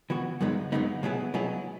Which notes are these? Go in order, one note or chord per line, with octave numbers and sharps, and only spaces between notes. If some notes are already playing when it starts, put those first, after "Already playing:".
E3 B3 F#4
F#2 C#3 G#3 B3 D#4
F#2 C#3 G#3 B3 D#4
B2 F#3 B3 E4 G#4
B2 F#3 B3 E4 G#4